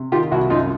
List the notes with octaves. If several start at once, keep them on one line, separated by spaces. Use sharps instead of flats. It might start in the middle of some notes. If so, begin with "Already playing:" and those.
Already playing: C3
D#3 F4 G4
C2 E4 F#4
F#2 D#4 F4